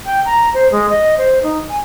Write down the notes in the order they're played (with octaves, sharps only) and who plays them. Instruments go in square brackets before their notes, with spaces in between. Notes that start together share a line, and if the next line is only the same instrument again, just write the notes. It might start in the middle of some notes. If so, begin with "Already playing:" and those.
[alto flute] G5
A#5
C5
G#3
D#5
C5
D#4
G#5